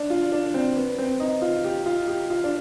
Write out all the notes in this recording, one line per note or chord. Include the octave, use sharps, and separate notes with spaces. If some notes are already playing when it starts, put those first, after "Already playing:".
Already playing: D4
F4
D4
C4
B3
C4
D#4
F4
G4
F4
G4
F4
D4